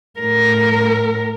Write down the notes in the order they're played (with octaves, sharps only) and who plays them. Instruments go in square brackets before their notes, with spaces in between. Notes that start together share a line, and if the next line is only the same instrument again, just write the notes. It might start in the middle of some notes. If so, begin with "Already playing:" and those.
[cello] A2 A#4